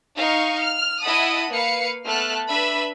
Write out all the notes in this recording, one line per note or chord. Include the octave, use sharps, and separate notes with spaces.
D#4 F5 C#6 C#7
F6
E4 D#5 F#5 A5 B5 D#6
A#3 B4 F5 C#7
A3 B3 A4 F6 F#6
D4 B4 E5 B5